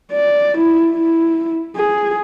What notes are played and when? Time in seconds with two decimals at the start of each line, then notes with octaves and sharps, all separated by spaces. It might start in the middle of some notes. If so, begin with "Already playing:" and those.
0.12 D5
0.57 E4
0.92 E4
1.76 G#4